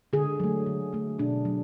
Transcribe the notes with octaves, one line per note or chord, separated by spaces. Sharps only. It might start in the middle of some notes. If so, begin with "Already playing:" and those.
D3 G#4
F#3 A3
D3
F#3 A3
B2 D4
F#3